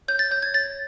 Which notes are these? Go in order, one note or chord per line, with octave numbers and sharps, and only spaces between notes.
C#5 G6
A6
C#5 G6
G#6
C#5 A6